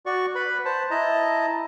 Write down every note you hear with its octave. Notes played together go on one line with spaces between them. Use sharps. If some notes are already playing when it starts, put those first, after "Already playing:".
F#4 D5 C#6
B4 B5
C5 A5
E4 D#5 A5 A#5